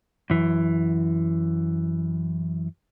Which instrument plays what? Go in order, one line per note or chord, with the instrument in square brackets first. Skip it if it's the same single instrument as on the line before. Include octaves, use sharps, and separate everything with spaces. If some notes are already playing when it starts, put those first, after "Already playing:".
[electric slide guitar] F#2 E3